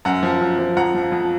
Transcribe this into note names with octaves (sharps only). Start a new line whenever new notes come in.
F#2 F#5 A#5
F3
F#2
F3
F2 F#5 A#5
F3
F2